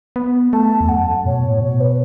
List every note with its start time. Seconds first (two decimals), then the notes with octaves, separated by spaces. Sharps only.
0.16 B3
0.53 A3 A5
0.80 E2
0.89 F#2 F#5
1.25 B2 C#5
1.44 A2
1.62 B2 C#5
1.80 B4